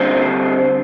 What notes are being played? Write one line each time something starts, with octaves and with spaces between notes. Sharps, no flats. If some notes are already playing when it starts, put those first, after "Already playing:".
Already playing: D3 G3 C4 C5